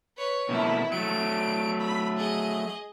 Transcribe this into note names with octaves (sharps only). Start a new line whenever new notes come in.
B4 C#5
B2 A3 A#3 E4
F#3 A3 D7
B5
G#4 D#5